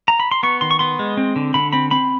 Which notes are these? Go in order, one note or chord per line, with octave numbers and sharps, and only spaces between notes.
A#5
B5
C6
B3 C#6
D#3 C6
C#6
B3 C6
G#3
C4
D3
D3 B5
C4 B5
C4 B5